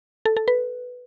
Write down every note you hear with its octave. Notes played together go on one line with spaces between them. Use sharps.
A4
A4
B4